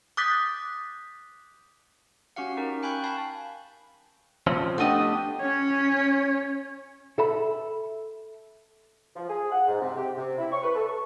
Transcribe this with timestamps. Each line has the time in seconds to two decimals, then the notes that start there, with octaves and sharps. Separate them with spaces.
0.17 D6 D#6 F#6 G6 A6 B6
2.36 C#4 F#4 G4 F5 F#5
2.57 C#4 D#4 A#4
2.83 G5 G#5 B5 C#6 F#6 G6
3.04 F5 G#5 A5 B5
4.47 F3 C4 C#4
4.78 A3 B3 D4 G4 D#5
5.40 C#4 C#5
7.18 A4 E5 B5
9.16 F3
9.29 G#4
9.51 F#5
9.68 G#2
9.81 C3
9.97 G4
10.17 C3
10.38 E4
10.52 C#6
10.64 B4
10.76 A4
10.87 C#6